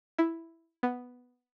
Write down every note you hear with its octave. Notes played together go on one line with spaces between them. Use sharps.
E4
B3